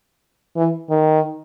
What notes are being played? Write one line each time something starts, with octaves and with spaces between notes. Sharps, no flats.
E3
D#3